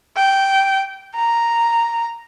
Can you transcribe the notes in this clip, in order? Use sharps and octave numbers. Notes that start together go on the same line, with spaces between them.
G5
A#5